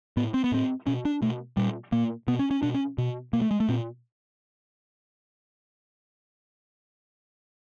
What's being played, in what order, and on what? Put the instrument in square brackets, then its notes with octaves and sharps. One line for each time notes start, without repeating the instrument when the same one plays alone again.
[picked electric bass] A2 B3
C4
B3
A2 C4
B2 C#4
D4
B2 A3
A#2 G3
A#2 A#3
B2 B3
C#4
C#4
B2 D4
C#4
B2
B2 A#3
A3
G#3
A3
A#2 C4